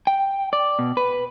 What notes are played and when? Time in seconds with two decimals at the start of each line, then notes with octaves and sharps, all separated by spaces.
0.07 G5
0.53 D5
0.79 B2
0.97 B4